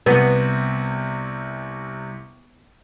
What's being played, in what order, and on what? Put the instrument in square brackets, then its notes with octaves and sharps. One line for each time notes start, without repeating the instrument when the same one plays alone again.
[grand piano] C2 C3 [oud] B3